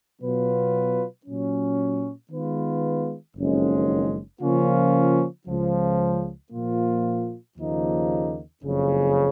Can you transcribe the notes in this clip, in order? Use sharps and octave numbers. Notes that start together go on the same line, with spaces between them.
B2 F#3 B3 F4 B4
A#2 F#3 C#4
D#3 G#3 B3 F4 B4
F#1 F2 D#3 G#3 C#4
C#3 F3 A#3 C#4 F4
C#2 C#3 F3
A#2 F3 A#3 F4
D#2 C#3 F3 A#3 D#4
F#1 F2 C#3